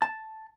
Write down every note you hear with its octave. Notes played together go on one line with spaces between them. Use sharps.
A5